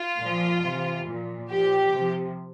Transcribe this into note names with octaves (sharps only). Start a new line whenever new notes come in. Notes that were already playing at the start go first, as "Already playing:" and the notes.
Already playing: F4
A#2 F3
C3 E3
A#2 F3
A#2 F3 G4
C3 F3